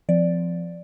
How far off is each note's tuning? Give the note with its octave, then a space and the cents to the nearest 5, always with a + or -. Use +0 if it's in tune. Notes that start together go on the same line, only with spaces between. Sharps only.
F3 +0 C4 -20 D5 +0